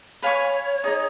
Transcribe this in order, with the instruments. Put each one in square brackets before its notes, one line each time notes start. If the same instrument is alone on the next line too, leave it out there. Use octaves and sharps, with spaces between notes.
[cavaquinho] B4 F5 G#5 C#6 [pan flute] C#5
[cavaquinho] D#4 G#4 D#5